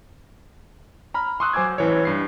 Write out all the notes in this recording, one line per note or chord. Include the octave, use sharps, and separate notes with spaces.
A#5 B5 F6
C6 C#6 D#6 E6 F#6
F#3 C5 G#5 D6 E6 G#6
A1 E3 C#5
G2 C7